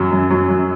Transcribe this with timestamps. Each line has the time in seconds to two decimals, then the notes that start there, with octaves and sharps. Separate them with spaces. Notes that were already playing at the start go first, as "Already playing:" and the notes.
Already playing: F#2 F#3
0.11 F#2
0.30 F#3
0.49 F#2